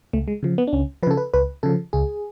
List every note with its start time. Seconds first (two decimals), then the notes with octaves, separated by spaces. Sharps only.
0.13 C#2 A3
0.28 G#3
0.43 C#3 F3
0.58 B3
0.67 D4
0.72 C#2 C#4
1.03 F3 B4
1.07 C#3 A4
1.17 B4
1.34 C#2 B4
1.63 C#3 F3 A4
1.93 C#2 G#4